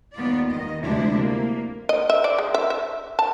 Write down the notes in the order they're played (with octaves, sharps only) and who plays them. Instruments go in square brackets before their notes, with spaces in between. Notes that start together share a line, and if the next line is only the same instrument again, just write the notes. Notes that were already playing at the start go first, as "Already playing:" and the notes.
[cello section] D#2 B3 F4 D5
D#3 D#5
D2 C3 F3 G#3 D4 E4
A#3
[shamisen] D#5
E5
D5
G#3
E5
E5
A5